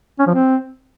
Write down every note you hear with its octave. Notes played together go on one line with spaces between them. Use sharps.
C#4
F3
C4